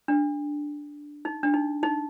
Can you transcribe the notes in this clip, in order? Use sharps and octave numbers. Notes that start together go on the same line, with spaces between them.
D4
D#4
D4
D#4
D#4